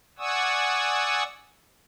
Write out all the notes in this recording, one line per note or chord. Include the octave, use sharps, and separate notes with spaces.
D5 F#5 G#5 C#6 D#6 E6